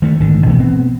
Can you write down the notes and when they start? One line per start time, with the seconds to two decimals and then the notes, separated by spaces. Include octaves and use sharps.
0.02 D#3 A3
0.20 G#1 D3
0.46 B2 E3 A3
0.59 B3 C4